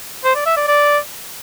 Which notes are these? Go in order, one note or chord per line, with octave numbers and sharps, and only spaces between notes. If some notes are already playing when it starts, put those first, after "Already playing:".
C5
D5
E5
D5
D5